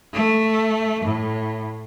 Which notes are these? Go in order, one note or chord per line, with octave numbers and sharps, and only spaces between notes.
A3
A2